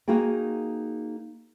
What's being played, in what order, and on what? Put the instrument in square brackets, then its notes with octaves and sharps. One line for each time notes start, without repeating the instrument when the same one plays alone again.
[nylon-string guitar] A#3 D#4 F#4 G#4 G5